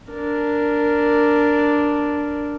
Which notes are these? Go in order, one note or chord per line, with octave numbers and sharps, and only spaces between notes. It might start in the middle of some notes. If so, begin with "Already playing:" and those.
D4 A#4